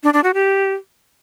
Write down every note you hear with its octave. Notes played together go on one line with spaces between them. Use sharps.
D4
D4
F#4
G4